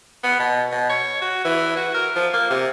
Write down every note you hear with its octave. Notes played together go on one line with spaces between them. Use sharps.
B3
B2
B2
C#5
F#4
E3
F#4
A#4
F3
A#3
C3